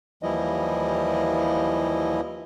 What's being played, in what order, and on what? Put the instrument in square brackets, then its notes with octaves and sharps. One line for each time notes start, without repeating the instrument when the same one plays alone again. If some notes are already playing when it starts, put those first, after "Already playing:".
[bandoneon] D#2 E3 F3 G3 E4 D#5